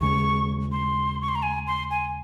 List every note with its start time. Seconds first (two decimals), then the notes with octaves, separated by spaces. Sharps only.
0.01 D#2 C#3 G#3 C#6
0.72 C6
1.22 C#6
1.29 C6
1.35 A#5
1.43 G#5
1.67 C6
1.90 G#5